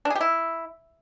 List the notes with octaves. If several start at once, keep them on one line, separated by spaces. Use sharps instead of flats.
D4
G#4
G4
E4